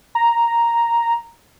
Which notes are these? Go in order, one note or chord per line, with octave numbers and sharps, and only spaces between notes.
A#5